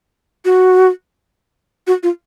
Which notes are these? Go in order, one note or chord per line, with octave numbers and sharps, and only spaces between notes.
F#4
F#4
F4